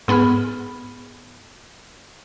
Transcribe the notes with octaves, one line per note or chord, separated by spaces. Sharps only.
G#2 B3 G#4 B5 F6